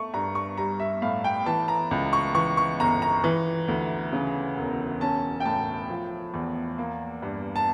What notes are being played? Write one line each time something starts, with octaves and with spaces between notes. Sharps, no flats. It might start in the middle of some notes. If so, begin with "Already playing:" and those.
Already playing: A3 C#6
G2 A#5
C#6
G3 A#5
E5
A2 F5
G5
E3 A5
A#5
C#2
C#6
E3 C#6
C#6
G1 A#5
A#5
E3
D2
C#3
E1
C#4 A5
G5
A2 A5
F3
E2
A#3
G2
A5